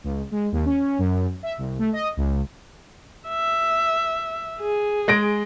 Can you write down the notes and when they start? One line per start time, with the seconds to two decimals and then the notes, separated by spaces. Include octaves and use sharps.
0.04 C#2
0.31 G#3
0.52 D#2
0.65 C#4
0.98 F#2
1.43 E5
1.58 C2
1.79 A3
1.93 D#5
2.17 C#2
3.28 E5
4.60 G#4
5.08 G#3 A#6 D7